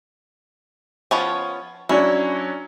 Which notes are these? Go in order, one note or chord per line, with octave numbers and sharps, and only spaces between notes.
F3 B3 C#4
F#3 C#4 D4 E4